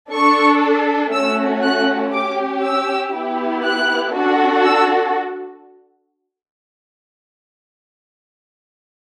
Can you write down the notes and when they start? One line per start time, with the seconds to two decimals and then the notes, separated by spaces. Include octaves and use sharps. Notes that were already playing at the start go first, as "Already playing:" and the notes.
0.12 D4 A4 C#6
1.12 A3 C#4 F#4 E6
1.63 F#6
2.13 C#4 G4 D6
2.63 E6
3.14 B3 E4 G4
3.64 F#6
4.15 D4 F#4 A4
4.65 E6